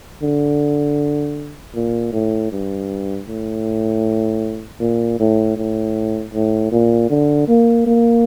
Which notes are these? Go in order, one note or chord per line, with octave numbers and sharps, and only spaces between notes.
D3
A#2
A2
G2
A2
A#2
A2
A2
A2
A#2
D3
A#3
A#3